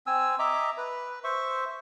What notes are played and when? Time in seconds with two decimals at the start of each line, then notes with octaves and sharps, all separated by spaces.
0.07 C4 G#5 E6
0.39 D#5 E5 A#5 D6
0.78 B4
1.24 C5 E5 C#6